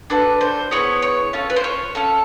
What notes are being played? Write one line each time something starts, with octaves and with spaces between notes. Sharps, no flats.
D4 F#4 A4 B4
C5
B3 E4 G#4 C#5
C#5
C#4 F4 A4
B4
C5
C#5
C#4 F4 A4